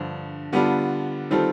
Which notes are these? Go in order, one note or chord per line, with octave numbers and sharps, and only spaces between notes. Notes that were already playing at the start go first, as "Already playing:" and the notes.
Already playing: G2 D3 F3
D3 G3 B3 D4 F4
D#3 G3 C4 F4 A4